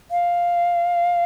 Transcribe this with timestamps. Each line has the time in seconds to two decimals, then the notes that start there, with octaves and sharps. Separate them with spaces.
0.11 F5